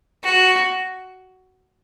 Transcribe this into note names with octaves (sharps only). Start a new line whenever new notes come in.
F#4